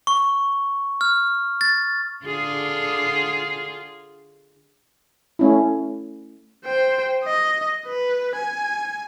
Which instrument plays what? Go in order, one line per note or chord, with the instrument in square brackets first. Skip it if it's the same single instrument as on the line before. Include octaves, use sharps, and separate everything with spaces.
[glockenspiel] C#6
F6
A6
[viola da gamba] D3 F4 G#4
[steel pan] A3 C#4 E4
[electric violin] C5 G5
D#5
B4
G#5